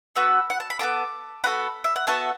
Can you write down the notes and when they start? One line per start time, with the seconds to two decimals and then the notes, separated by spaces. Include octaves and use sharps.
0.15 B3 F#4 A4 B5 E6
0.50 F#5
0.60 A5
0.70 B5
0.79 B3 F#4 A4 A5 D6
1.44 B3 F#4 A4 F#5 B5
1.84 E5
1.96 F#5
2.07 B3 F#4 A4 E5 A5